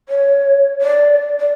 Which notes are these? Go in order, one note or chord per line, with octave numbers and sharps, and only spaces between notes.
C#5
D5
D5